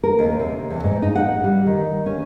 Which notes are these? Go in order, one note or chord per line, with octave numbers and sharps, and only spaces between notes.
A#4
D#2
C3
E2
G#2
D#4
F#5
G3
D#3
C#4